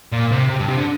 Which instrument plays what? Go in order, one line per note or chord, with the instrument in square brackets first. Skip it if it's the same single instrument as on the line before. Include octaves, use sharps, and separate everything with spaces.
[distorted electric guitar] A#2
C3
C3
G2
C3
D3